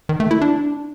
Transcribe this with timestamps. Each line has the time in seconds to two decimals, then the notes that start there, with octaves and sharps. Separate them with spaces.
0.09 D#3
0.20 A3
0.31 E4
0.41 D4